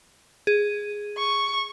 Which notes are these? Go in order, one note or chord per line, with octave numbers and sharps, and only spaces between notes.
G#4
C#6